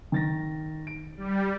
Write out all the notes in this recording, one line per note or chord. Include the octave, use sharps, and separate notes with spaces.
D#3 A6 A#6
D7
G3